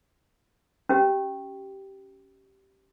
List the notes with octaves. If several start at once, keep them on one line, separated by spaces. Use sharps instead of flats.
C#4 G4